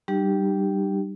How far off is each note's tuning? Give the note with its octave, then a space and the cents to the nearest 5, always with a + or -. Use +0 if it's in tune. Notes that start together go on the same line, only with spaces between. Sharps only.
G3 -15 D#4 -40 G4 +0